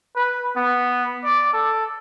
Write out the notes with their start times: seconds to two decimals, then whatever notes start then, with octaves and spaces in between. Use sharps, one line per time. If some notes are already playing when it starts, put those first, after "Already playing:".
0.16 B4
0.56 B3
1.24 D5
1.53 A4